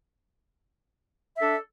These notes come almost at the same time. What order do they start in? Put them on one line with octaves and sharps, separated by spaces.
E5 A4 D4